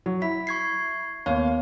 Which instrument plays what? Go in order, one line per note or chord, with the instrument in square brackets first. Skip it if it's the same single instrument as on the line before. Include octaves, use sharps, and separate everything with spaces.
[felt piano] F#3
[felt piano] E4 [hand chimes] B6
[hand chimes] C#6 G#6 C7
[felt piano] D#2 F5 [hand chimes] B3 C#5